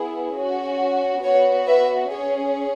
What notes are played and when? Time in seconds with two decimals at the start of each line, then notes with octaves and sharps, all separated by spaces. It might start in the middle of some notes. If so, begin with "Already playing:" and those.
Already playing: B3 E4 G#4
0.36 C#4 F#4
1.23 B3 F#4 C#5
1.67 B4 E5
2.11 C#4 G#4 C#5